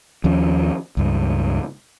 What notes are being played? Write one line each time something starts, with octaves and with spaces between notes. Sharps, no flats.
D#2 F3 C#4
C#2 G2